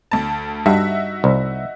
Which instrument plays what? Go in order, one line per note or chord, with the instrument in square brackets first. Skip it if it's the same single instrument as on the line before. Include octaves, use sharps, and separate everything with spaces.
[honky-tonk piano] D2 A5
[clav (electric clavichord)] G2 [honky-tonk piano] D#4 F#4 E5
[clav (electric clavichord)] C2